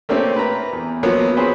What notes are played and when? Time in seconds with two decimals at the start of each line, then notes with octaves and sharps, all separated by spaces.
0.09 A3 A#3 C4 C#4 G4
0.36 B4 A#5
0.73 E2
1.03 F3 F#3 A#3 B3 C#4
1.37 C4 C#4 G#4 B4 C5